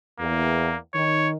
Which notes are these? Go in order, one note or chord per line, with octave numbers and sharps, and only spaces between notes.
E2 A#3
D#3 C#5